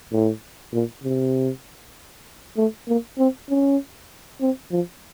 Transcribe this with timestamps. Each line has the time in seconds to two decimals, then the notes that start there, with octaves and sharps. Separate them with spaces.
0.12 A2
0.73 A#2
1.04 C3
2.57 A3
2.88 A#3
3.18 C4
3.49 C#4
4.41 C4
4.71 F3